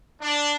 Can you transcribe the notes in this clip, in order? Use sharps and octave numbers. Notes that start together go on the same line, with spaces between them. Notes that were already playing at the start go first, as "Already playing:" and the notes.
D4